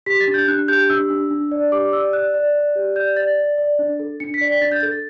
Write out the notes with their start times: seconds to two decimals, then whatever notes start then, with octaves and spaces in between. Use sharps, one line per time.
0.06 G4 B6
0.21 A6
0.28 D4
0.34 G6
0.48 D4 F#6
0.68 G4 G6
0.89 D4 E6
1.10 D4
1.31 D4
1.52 D5
1.72 G4 D6
1.93 D5 E6
2.13 D5 F#6
2.34 D5
2.55 D5
2.76 G4
2.96 D5 G6
3.17 D5 A6
3.38 D5
3.58 D5
3.79 D4
3.99 A4
4.20 D4 C#7
4.34 B6
4.41 D5
4.48 B6
4.61 D4 A6
4.72 G6
4.81 A4 A6